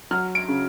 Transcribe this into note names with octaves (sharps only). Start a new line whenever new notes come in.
F#3 F6
D7
C#3